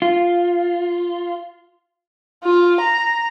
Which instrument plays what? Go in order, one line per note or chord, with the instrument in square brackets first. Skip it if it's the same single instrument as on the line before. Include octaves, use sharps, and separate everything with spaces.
[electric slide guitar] F4
[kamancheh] F4
A#5